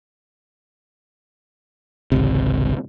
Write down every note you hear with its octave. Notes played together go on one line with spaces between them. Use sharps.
G#1 C#2 C3